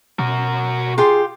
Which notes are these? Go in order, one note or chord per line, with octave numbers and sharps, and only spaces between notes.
B2 F#4 A#4
F4 G4 G#4 C6